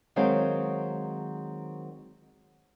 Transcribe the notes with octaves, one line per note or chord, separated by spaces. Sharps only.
D#3 F#3 G#3 C4 F5